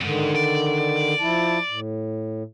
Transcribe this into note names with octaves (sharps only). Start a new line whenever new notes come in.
F2 G#2 D3 D#3
D5
F3 E4 A5
A2